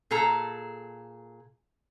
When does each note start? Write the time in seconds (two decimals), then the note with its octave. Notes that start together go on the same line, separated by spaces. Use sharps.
0.11 A#2 G#4 A4 A#5